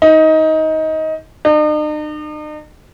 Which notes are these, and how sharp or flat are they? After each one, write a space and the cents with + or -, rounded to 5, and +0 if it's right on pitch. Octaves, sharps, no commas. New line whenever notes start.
D#4 +20
D#4 -45